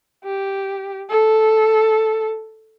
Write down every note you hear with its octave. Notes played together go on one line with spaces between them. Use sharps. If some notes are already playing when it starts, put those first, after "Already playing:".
G4
A4